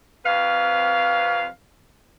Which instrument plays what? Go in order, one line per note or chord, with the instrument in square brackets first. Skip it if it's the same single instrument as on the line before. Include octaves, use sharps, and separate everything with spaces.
[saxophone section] F2 C3 B4 F5